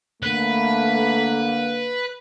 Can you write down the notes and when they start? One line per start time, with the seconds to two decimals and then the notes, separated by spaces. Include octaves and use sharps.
0.23 D3 A3 A#3 B4